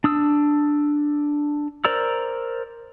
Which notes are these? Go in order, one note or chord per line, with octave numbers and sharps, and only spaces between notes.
D4 D#6 E6
A#4 C5 D5 A#5 E6